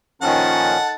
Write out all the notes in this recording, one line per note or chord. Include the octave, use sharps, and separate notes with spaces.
A#2 D#3 F3 C#4 A4 F#5